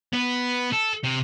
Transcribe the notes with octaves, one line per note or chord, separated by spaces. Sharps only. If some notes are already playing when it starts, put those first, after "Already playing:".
B3
A4
C3